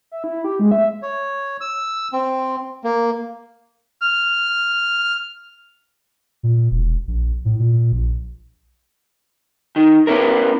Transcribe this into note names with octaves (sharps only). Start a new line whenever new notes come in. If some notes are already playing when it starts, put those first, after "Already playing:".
E5
E4
G4
G#3
E5
C#5
E6
C4
A#3
F6
A#2
E1
A#1
A2
A#2
A#1
D#3
B3 C#4 E4 A#4